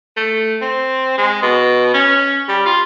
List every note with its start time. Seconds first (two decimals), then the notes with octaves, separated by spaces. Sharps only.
0.17 A3
0.61 C4
1.18 G#3
1.42 B2
1.94 C#4
2.48 G3
2.65 F4